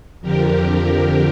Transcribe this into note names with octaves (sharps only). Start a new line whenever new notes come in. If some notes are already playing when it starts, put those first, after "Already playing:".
F2 D3 F3 G4 A#4